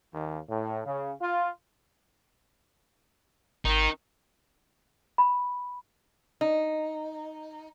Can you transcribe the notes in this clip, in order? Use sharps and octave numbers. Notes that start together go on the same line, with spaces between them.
D#2
A2
C#3
F4
G#1 D#3 D#4
B5
D#4